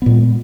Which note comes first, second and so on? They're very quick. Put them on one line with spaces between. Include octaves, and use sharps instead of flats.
B3 A#2 G#3